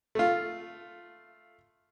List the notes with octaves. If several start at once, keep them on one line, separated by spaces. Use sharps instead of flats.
A3 F4